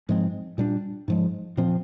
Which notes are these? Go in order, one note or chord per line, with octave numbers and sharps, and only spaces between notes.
G#2 F3 G#3 C4
A#2 G3 D4
G#2 F3 G#3
A#2 F3 C4